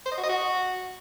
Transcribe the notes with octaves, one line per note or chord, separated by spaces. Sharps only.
C5
D#5
F#4
D#5
F#4